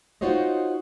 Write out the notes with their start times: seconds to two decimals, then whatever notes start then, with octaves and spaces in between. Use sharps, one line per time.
0.21 D#4 F4 F#4 C5 C#5 D#5